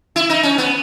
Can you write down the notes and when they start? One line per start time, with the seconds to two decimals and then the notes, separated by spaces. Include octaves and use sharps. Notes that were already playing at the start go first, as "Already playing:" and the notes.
0.16 E4
0.30 D#4
0.43 C#4
0.58 B3